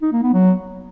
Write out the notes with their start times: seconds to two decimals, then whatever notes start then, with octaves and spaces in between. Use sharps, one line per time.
0.02 D#4
0.13 A#3
0.23 B3
0.33 F#3